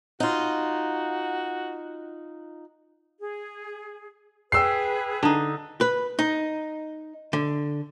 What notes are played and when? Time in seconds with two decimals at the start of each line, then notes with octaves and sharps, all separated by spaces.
0.20 D#4 F4 F#4
3.20 G#4
4.52 G#4 B4 G5 E6 C7
5.23 D3 D#4
5.81 B4
6.19 D#4
7.33 D3